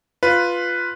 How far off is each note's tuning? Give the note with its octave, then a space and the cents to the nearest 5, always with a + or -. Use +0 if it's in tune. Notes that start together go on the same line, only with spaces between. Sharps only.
F4 +0 B4 +0